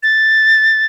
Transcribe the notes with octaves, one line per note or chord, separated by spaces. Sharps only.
A6